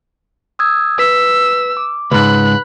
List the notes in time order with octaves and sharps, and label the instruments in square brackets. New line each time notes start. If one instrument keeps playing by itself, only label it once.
[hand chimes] D#6 E6 G#6
[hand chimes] B4 B6 [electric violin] E6
[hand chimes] D6
[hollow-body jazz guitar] C#2 G#2 [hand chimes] B4 [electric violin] B5 F#6